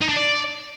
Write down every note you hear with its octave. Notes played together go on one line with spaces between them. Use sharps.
D#4
D4
D5